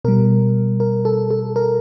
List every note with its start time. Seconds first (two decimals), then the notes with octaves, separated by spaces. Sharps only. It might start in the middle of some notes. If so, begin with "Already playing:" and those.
0.04 B2 G3 A#4
0.80 A#4
1.05 A4
1.30 A4
1.56 A#4